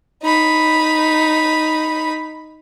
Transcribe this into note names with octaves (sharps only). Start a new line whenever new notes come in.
D#4 B5